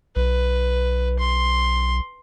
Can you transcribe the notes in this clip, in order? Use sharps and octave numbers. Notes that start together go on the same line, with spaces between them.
B1 B4
C6